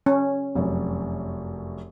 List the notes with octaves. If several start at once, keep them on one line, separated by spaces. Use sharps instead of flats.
C#4
F1 F#2